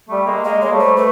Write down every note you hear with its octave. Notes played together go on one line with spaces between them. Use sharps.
G3 A3
G#3 A#3
G#3 A#3 D#5
G#3 C#5
G3 A3
C5
A3 B4